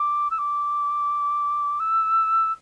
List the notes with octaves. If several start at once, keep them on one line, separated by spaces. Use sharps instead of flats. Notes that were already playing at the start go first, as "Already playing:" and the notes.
Already playing: D6
E6
D6
E6